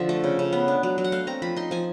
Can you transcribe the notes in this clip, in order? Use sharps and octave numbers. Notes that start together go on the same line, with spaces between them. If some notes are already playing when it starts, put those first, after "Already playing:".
Already playing: D3 F3 E5
A3
C#3
C#3
B3
D4
F#3
F#3
F#5
A3 F5
C4 A#5
F3 B5
D#4 C6
F3 G#5